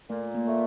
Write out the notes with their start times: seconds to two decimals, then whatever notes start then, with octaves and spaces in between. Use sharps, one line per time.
0.10 A#2 A3
0.35 A#3
0.47 A3